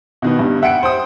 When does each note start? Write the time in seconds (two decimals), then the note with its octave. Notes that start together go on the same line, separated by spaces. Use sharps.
0.22 B2 D#3 B3
0.39 G2
0.62 E5 F#5 G5 C#7 D7
0.83 C5 G5 D#6